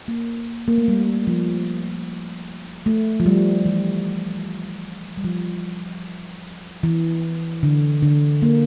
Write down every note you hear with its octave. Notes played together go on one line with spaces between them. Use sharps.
A#3
A#3
A3
G3
F3
A3
F3
G3
E3
G3
F3
E3
D3
D3
A#3